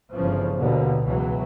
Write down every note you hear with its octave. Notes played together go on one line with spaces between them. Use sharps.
G1 C#3 E3 F3
D#2 B2 D3
C#2 B2 E3 F#3